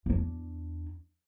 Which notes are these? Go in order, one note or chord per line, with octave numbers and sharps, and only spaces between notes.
E2 D4